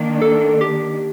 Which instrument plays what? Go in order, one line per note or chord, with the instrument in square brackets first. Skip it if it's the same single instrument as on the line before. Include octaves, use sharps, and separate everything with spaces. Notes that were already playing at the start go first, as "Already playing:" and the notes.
Already playing: [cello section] D#3 A#3 D4
[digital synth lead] A4
G4